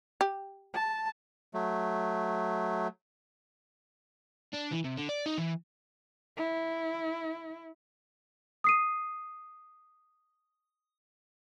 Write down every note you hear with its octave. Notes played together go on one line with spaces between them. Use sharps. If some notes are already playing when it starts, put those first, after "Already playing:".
G4
A5
F#3 A3
D4
E3
C3
D3
D5
D#4
E3
E4
D#6 C7 D#7